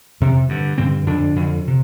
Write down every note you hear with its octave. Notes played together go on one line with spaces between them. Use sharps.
F2 C3
G2 D3
G2 D3 C4
F2 D3 D4
F2 D3
C3